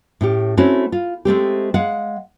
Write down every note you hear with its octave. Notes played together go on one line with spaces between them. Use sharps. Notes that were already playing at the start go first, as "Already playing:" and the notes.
A2 C#4 G4
A3 C4 C#4 E4 F#4
F4
G#3 A3 C4 G4
G#3 F5 F#5